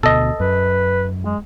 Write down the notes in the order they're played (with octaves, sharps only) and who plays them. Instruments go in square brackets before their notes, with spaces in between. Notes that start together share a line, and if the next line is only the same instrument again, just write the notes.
[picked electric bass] D2 B2 [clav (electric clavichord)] A4 D#5
[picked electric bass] F#2 [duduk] B4
[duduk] G#3